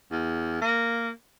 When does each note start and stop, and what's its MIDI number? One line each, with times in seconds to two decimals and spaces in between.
0.11 0.59 40
0.61 1.10 58